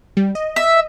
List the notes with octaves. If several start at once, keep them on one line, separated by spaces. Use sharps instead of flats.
G3
D#5
E5